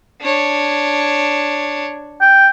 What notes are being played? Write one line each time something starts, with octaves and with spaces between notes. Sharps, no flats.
D4 C#5
G5